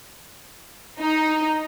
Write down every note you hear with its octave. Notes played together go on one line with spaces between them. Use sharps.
D#4